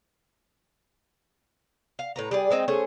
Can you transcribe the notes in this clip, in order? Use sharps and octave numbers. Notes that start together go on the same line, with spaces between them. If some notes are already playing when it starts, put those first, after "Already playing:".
F5
A2 B4 A#5
G3 G#4 D5
G#3 C4 D#4
A3 C#4 G#4 C5